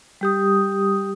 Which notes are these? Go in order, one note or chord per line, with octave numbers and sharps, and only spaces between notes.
G3 G4 D#6